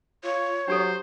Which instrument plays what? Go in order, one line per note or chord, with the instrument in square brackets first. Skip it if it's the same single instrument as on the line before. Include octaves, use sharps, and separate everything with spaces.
[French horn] F4 [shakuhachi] C#5
[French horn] F#3 [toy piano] D4 G4 A4 [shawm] C5